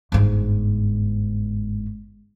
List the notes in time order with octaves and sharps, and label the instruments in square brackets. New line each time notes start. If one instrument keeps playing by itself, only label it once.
[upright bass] G1 G#2